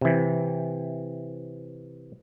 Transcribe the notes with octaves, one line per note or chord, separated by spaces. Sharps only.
C3 E3